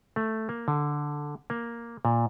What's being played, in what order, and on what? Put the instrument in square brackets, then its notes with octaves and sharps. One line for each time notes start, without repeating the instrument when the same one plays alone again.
[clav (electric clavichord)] A3
A#3
D3
A#3
A#2